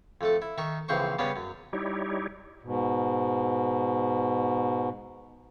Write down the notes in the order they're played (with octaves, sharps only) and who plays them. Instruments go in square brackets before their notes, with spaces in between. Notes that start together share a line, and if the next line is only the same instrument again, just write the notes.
[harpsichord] F2 A3 A4
E4
D#3 E5 C#6
A#1 C#3 E3 C4 C5 C#6
C#3 G3 B3 C#4 D4
F#2
[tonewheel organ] G3 D#4 E4 G4 C#5
[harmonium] G#2 B2